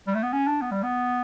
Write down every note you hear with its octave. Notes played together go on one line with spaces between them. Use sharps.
G3
A3
B3
C#4
D4
B3
G3
B3